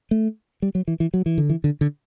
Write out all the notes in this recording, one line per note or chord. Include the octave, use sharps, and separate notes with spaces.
A3
G3
F#3
E3
E3
F#3
E3
D3
E3
D3
D3